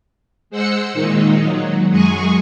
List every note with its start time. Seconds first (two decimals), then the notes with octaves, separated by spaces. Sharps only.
0.50 G#3 C5 F#5 E6 C#7
0.93 A#2 D#3 G#3 D#4
1.40 F#3
1.90 F#2 F#3 G#3 G#4 G#5 C#6